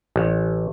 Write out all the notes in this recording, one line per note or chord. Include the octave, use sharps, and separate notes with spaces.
A1